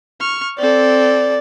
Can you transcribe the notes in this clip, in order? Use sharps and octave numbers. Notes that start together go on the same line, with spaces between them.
C#6 F6
C4 A4 D5